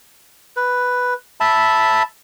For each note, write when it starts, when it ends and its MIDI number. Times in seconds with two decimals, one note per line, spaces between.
0.56 1.14 71
1.40 2.03 76
1.40 2.03 81
1.40 2.03 83